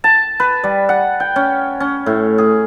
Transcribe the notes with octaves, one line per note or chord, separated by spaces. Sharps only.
A5
B4
G3
F#5
G5
C#4
C#4
A2
G#4